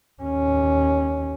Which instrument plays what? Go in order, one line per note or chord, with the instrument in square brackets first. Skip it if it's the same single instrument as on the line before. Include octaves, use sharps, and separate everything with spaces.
[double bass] D#2 C#4